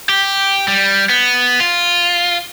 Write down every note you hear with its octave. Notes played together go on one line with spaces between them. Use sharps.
G4
G3
B3
F4